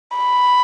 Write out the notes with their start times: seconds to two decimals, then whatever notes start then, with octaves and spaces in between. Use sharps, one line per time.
0.17 B5